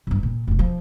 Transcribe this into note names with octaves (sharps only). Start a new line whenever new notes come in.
G1 G2
A#2
F1 B1
F3